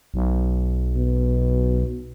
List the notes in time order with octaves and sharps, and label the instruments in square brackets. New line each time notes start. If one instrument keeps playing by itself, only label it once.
[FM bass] B1
[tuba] B2